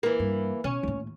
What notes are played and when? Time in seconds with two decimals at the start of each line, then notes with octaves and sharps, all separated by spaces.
0.03 E3 A#3
0.19 G2
0.64 B2 C#4
0.83 D#2 A2